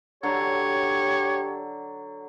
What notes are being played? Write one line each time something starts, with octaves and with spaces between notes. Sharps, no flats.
D3 F#3 G4 C#5